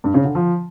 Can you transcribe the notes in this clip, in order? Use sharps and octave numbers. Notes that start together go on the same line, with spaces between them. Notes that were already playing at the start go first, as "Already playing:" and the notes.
G2
C#3
D3
F3